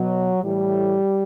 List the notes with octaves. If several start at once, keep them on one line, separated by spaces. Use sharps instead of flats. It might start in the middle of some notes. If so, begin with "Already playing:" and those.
Already playing: B2 F#3
A2 E3 G3